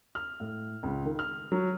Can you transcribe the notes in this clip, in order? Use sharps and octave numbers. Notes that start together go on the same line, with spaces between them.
F6
A2
C#2
D#3
F6
F#3